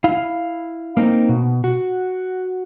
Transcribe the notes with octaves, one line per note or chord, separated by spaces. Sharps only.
E4 F5
A#3 C4 D#4
B2
F#4